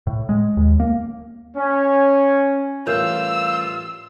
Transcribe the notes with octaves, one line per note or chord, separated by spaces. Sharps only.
A2
G#3
D#2
A#3
C#4
A1 G3 F4 A#4 C#5 E6 G6